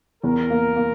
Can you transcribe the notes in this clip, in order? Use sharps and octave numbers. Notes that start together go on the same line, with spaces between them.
E2 A#4
A#3
A#3